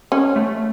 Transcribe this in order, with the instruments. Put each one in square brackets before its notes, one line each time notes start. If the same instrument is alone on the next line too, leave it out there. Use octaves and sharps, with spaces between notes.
[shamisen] C#4
[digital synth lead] A3